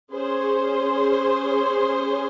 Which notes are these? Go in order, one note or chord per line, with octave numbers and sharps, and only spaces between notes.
C#4 G#4 C5